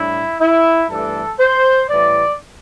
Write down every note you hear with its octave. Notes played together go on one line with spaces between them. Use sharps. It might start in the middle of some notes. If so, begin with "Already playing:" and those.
Already playing: A2 G3 D4 E4
E4
G2 E3 A3 D4 A4
C5
A2 E3 G3 D5